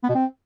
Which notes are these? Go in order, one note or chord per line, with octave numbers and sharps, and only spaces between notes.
B3
B2
C4